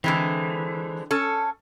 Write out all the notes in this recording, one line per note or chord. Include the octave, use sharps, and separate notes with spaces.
D3 E3 G#3 C4
C#4 A4